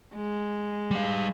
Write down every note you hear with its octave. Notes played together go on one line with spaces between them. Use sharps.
G#3
G3 F5